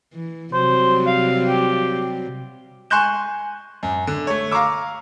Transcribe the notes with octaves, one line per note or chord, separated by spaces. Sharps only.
E3
C3 F#3 G3 C5
F5
G4
G#5 C6 C#6 F#6 G6 E7
F#2
D3
A3 C#5
F5 A#5 C#6 D6 E6